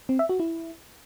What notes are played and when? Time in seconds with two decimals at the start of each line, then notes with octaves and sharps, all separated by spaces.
0.09 C4
0.19 E5
0.29 F#4
0.40 E4